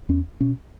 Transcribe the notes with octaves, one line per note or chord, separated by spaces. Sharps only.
E2 C#4
B2 C#4